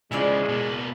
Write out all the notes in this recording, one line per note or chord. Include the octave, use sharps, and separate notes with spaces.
C#3 F3 G#3 E4 F4 D5
B2 A#3